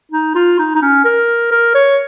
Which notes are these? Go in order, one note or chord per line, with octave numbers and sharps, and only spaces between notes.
D#4
F4
D#4
D#4
C#4
A#4
A#4
C#5